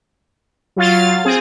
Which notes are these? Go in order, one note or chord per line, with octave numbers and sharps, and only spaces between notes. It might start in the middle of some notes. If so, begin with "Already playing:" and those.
F#3 F4 F5 A6
C4 G#4